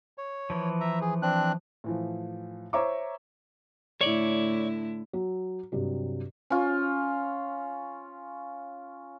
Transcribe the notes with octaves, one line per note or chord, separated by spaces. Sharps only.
C#5
E3 F3
E5 A#5
G#4
C4 D4 F#6
A2 E3 F3
C5 C#5 E5 A#5 C#6 D6
A2 D3 E4 C#5 D5
F#3
G2 C3 F#3
C#4 F4